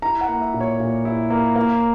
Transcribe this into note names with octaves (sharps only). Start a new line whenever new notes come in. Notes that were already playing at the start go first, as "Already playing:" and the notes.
E4 A#5
F#5
A#3
E5
A#2
C#5
A#2
E4
A#3
A#3